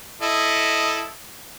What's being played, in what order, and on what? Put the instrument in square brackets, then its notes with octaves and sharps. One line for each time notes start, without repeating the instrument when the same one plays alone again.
[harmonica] E4 A4 D#5